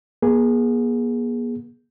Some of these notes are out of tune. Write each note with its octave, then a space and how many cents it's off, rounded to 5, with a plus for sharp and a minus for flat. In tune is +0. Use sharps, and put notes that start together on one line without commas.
A#3 +45 G#4 -5